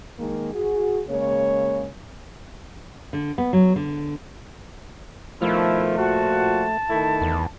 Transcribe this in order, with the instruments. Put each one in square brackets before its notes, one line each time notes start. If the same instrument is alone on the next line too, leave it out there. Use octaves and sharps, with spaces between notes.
[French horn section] D#3 G#3 A#3
F#4 G#4
C#3 G#3 A#3 C#5
[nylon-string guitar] D3
B3
F#3
D3
[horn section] B2 D#3 F3 [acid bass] A3 [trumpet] E4
[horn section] A#2 F3 F#4 [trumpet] A5
[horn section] D#3 A3 E4
[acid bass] E2